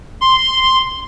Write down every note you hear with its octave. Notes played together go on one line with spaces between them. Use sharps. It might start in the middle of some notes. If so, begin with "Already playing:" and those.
C6